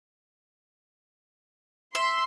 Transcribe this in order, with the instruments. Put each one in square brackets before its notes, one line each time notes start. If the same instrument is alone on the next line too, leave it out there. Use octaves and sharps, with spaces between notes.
[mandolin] E5 [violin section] C6